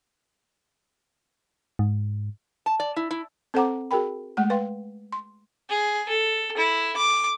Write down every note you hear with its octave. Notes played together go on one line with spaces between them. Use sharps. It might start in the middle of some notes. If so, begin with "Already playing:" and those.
G#2
A5
D5
E4
E4
C4 A4 C5 F#5 A#5 D6
F#4 G#4 A#4 G5 B5
G#3 A3 F#5
B4 F5 G5 C6
C6
G#4
A4
E4
D6